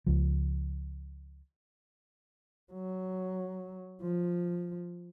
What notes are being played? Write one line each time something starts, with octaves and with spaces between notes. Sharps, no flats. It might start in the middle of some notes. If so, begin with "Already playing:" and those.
C#2 F3
F#3
F3